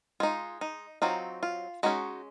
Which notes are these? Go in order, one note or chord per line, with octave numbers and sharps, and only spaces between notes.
G#3 D#4 F4
D#4
F#3 C4 D#4 F4
F4
G#3 C#4 D#4 F#4